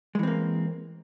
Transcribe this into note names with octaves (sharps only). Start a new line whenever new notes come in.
E3 G#3 A#3 C4